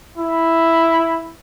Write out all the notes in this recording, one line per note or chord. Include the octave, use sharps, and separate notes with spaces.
E4